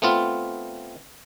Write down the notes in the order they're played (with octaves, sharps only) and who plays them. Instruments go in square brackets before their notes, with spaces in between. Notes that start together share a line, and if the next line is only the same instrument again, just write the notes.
[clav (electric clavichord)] A3 B3 C4 F4